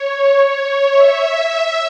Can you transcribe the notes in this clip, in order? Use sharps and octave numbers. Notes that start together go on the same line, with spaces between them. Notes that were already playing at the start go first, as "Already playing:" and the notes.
Already playing: C#5
C#5
E5